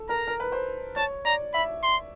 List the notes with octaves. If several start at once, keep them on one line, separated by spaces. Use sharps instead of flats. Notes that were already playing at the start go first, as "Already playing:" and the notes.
Already playing: A4
A#4 A#5
A#4
B4
C5
C#5 A5
D5 A#5
E5 B5
C6